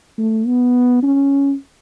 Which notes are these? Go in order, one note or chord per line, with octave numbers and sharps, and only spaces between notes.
A3
B3
C#4